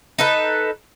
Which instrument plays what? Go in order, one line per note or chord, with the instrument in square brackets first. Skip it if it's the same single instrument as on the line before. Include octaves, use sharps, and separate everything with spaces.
[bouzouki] D#4 A4 B4